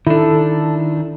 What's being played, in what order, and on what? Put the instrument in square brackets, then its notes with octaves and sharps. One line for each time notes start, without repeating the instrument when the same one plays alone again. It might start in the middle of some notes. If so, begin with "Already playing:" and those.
[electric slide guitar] D#3 D4 [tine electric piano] E4 [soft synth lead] A4